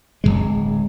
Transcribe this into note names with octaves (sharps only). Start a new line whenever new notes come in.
D1 E2 G#3